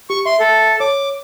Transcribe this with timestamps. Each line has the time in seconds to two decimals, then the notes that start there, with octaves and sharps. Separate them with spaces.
0.10 G4 C#6
0.26 E5 C6
0.40 A4
0.80 C#5 D6